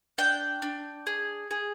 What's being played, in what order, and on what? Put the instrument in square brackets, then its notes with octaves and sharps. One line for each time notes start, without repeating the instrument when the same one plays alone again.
[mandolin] D4 G5
D4
G#4
G#4